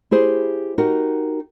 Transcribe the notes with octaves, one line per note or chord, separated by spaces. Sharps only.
E4 G4 G#4 C5
D#4 F#4 G4 A#4